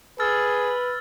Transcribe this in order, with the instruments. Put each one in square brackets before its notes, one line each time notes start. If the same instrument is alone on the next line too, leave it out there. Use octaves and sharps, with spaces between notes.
[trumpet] G#4 [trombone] B4 [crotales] E6 F6 A6